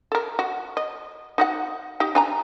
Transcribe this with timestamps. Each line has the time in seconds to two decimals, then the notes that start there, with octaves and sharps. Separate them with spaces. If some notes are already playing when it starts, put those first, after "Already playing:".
0.12 A4 A#4
0.39 F#4
0.77 D#5
1.38 D#4 F#4 F#5
2.00 D#4 G4
2.15 D4 G#5 A#5